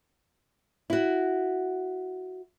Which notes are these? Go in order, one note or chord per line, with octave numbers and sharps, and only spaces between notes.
E4 F#4